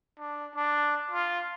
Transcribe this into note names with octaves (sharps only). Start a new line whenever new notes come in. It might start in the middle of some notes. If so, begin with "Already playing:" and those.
D4
D4
F4